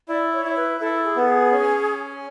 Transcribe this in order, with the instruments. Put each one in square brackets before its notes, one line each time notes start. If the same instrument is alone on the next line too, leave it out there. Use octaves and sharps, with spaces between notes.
[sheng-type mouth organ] E4 [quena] D5
[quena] C#5
[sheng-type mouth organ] E4
[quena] B4
[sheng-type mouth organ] E4 [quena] A4
[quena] G#4
[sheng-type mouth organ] B3
[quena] A4
G#4
[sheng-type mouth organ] C#4